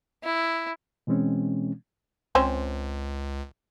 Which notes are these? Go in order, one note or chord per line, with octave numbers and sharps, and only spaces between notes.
E4
B2 E3 G#3 C4 C#4
C#2 C4 C#4 C5